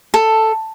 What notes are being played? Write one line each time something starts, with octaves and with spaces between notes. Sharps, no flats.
A4